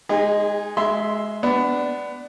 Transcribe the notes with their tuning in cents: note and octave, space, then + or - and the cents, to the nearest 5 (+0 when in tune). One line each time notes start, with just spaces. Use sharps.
G#3 +0 D#4 +0 G#4 -35
G#3 +20 E5 +0 C6 +0
B3 +20 D4 +0